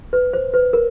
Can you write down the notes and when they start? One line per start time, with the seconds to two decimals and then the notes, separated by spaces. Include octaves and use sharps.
0.13 B4
0.33 C5
0.54 B4
0.73 A#4